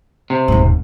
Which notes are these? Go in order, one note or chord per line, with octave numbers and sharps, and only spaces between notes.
C3
D#1 G#2